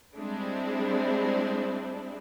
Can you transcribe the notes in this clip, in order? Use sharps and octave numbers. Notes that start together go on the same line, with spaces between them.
G3 G#3 C4 D4 E4